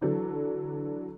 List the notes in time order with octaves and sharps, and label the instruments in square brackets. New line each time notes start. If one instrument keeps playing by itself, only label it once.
[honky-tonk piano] D3 E3 F#3 D4 A4